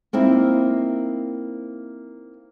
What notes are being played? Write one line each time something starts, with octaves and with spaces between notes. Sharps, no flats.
A#3 C4 D#4 E4